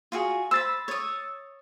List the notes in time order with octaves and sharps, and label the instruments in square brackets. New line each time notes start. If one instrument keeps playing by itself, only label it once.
[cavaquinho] F4 F#4 G#4
[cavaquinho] C5 B5 [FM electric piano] E6 A6
[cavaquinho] C#5 D#6